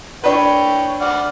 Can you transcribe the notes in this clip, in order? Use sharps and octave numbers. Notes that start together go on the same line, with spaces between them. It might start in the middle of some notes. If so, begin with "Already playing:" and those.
D4 B4 C#5 G5
D5 F#5 F6